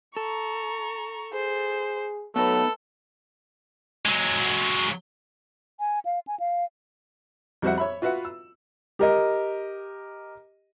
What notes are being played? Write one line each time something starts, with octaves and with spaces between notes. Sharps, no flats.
A4 A#5 C#6
G#4 C5
F#3 A3 B3 D#4 A4 B4
F#3 G#3
G#5
F5
G#5
F5
F2 G3 F#4 C5 E5 F#5
C#5 E5 B5
F4 F#4 B4 E5 F#5
E6
G4 A#4 D#5